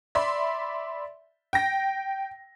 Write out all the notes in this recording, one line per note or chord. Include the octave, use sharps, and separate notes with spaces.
D5 E5 B5 C6
G5 A#6